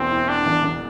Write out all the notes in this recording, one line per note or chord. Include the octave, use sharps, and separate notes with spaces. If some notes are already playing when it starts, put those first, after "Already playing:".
Already playing: E1 E2 E3 C4
E3
E3 D4
E1
E1